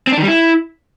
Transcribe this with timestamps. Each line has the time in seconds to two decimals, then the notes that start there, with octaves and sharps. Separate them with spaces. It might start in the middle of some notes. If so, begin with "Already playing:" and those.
0.07 C4
0.12 D4
0.17 D#3
0.23 G3
0.28 E4